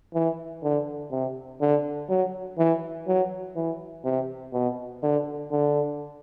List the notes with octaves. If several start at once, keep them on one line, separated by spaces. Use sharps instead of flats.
E3
D3
C3
D3
F#3
E3
F#3
E3
C3
B2
D3
D3